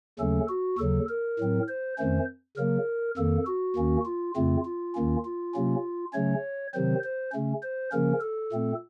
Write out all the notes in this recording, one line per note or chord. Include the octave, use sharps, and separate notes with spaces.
D#2 C#3 F#3 A3 C#4 A4
F#4
D#2 C#3 F#3 A4
A#4
A2 F#3 C4
C5
F2 D#3 A3 C#4 C5
C#3 F#3 A#3 A#4
F2 D#3 A#3 A4
F#4
D#2 D#3 A#3 C#4
F4
F2 C#3 A3 C4 F4
F4
D#2 D#3 A#3 C#4
F4
C3 F#3 A#3 C#4
C#3 F#3 A3 C#4 C#5
C3 D#3 F#3 C4 C5
C5
C#3 A3 C#4
C5
C#3 F3 A#3 C#4 A#4
A4
A#2 A3 C4